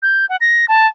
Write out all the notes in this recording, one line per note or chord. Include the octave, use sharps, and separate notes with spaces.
G6
F#5
A#6
A5